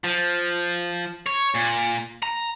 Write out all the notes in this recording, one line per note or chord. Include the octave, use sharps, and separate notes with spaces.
F3
C#5
A#2
A#5